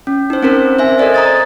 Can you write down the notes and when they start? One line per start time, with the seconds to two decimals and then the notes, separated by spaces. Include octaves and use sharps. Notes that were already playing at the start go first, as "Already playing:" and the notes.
0.07 C#4
0.30 D#4 C5
0.43 C4 C#4 A#4 C5
0.79 C5 E5 G#5
0.98 A4 A#4 C5 D5 D#5
1.14 A#5 D#6 A6